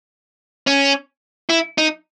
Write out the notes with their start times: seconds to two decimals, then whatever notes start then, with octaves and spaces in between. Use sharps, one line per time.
0.67 C#4
1.49 E4
1.78 D#4